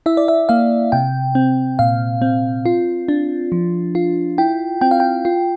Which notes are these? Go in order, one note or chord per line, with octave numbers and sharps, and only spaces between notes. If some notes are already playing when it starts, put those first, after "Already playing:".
E4 E5
D5
E5
A#3 F5
C3 G5
C4
A#2 F5
C4
F4
D4
F3
F4
E4 G5
C4 G5
F5
G5
F4